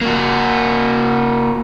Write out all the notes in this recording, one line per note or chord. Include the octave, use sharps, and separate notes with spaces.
A#3 F#4